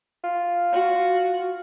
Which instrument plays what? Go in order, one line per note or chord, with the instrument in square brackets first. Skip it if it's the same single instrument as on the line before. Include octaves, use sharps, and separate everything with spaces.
[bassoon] F4
[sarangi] F#4